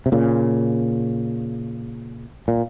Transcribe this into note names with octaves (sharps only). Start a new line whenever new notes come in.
C3
A#2 C#3
A#2